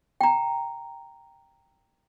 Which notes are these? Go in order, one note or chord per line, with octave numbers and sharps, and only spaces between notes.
G5 A#5